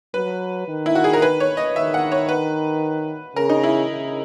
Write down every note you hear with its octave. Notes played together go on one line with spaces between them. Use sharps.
F#3 B4
D#3
E4
F#4
G#4
A#4
B4
C#5
D#5
D#3 E5
F#5
C#5
B4
C#3 A#4
D#4
E4
C#3